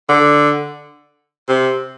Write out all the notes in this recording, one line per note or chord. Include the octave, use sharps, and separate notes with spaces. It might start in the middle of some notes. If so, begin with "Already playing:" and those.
D3
C3